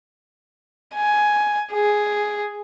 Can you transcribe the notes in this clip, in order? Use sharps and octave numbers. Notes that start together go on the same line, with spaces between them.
G#5
G#4